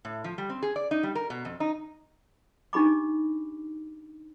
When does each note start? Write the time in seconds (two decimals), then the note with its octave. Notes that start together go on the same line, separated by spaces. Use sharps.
0.05 A2
0.24 F3
0.38 G3
0.50 C4
0.63 G#4
0.76 D5
0.91 D#4
1.03 G3
1.15 A#4
1.30 B2
1.45 F2
1.60 D#4
2.73 D4 D#4 G4 B5 D6